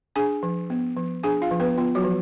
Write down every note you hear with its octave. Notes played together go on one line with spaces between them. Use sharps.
D4 G#4 G#5
F3
B3
F3
D4 G#4 G#5
F4 F5
F3
B3 B4
B3 F4
F#3 F#4
F3